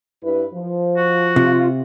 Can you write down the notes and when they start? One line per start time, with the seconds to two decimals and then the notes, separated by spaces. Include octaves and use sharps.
0.24 G2 E4 B4
0.54 F3
0.97 F#4
1.36 C3 F4